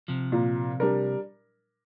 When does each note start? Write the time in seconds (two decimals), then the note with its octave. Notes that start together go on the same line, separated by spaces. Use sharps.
0.08 C3 F3
0.32 A#2
0.80 G3 D4 A#4